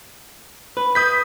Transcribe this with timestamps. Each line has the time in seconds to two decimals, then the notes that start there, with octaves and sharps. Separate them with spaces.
0.77 B4
0.95 D#6 G6 B6